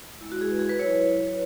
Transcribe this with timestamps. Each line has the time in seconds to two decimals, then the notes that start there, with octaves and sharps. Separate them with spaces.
0.21 G#3 E4
0.32 F#4
0.41 G#4
0.51 B4
0.59 G#4
0.69 B4
0.79 F#3 E4 C#5